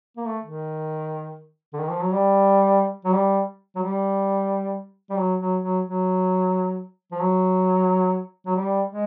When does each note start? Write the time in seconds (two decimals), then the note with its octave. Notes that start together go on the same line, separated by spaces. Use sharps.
0.17 A#3
0.27 A3
0.44 D#3
1.73 D3
1.79 D#3
1.91 F3
2.02 F#3
2.13 G3
3.05 F#3
3.14 G3
3.76 F#3
3.82 G3
5.10 G3
5.18 F#3
5.40 F#3
5.63 F#3
5.86 F#3
7.12 F3
7.20 F#3
8.47 F#3
8.56 G3
8.90 G#3